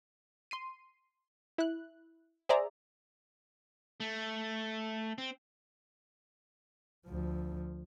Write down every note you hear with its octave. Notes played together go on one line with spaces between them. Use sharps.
C6 C7 D#7
E4 F#6
G#4 C5 D5 E5 A#5
A3
C4
D2 F3